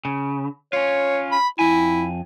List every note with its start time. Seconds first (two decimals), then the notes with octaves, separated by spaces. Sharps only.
0.05 C#3
0.73 C#4 F4 C#5
1.32 B5
1.59 F2 E4 G#5